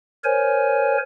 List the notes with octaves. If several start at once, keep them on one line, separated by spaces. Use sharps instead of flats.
A#4 C5 C#5 G#5